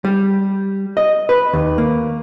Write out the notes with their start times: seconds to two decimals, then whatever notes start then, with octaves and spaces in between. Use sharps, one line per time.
0.05 G3
0.97 D#5
1.29 B4
1.53 D#2
1.78 A#3